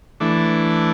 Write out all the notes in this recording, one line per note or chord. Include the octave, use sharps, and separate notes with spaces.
E3 A3 D4